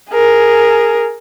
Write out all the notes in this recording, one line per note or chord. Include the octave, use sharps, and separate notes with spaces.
G#4 A#4